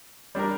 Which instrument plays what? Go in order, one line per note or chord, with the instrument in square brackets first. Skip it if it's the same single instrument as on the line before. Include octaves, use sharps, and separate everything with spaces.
[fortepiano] G3 D4 G4 A#4